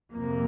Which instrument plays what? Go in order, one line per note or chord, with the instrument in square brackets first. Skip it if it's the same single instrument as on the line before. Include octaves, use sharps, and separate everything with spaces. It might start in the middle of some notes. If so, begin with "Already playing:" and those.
[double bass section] F2 C3 A#3